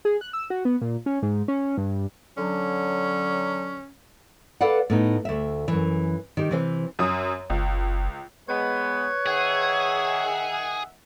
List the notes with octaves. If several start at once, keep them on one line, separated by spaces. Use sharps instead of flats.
G#4
F#6
E6
F#4
B3
A#2
C#4
G#2
C#4
G2
D3 F#3 C#4
A4 B4 D5 F5 F#5
A2 B3 D#4
D2 E5
F#2 E3
D#3 G4
C3 E3 C5
F#2 D#6
F#1 C#2
G#3 B3 B4 C#5
D#3 G#4 E5 F#5